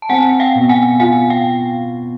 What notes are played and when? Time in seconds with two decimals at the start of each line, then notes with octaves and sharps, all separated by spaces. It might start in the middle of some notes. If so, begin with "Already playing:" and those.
0.02 A5
0.09 C4 F#5 G#5
0.29 F#5
0.40 F5 G5
0.55 B2
0.69 F#5 G#5
1.00 F4 F#5 G#5
1.30 F5 G5